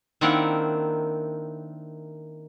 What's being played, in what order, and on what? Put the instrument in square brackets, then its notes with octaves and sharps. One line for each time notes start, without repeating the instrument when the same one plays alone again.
[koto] D#3 A#3 C4 D4 E4 F#5